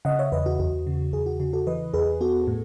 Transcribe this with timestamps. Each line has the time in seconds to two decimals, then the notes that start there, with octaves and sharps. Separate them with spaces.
0.05 C#3 D#5 F#5
0.19 C#5 E5
0.32 E2 B4 D#5
0.46 F#4
0.59 E2 F#4
0.87 C#3
1.13 E2 G#4
1.26 F#4
1.40 C#3 F#4
1.53 F#4 A4
1.67 E3 B4 D#5
1.94 E2 G#4 B4
2.21 B3 F#4 A4
2.47 A2